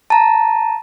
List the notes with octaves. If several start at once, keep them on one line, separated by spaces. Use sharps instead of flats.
A5 A#5